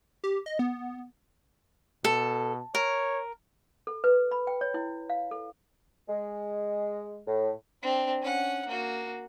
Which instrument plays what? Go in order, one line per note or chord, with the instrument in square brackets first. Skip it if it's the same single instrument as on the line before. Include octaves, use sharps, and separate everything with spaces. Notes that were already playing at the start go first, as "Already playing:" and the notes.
[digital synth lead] G4
D#5
B3
[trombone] B2 [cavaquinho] A4
[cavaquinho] A#4 [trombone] C#5
[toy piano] A4
B4
B5
G5
C#5
E4
F5
A4
[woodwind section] G#3
A2
[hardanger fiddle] C4 D4
C#4 F#5
A#3 F#4